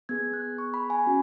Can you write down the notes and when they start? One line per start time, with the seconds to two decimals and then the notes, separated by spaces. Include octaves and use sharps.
0.09 B3 G#4 G#6
0.34 F#6
0.58 C#6
0.74 B5
0.90 G#5
1.06 C#4 F#4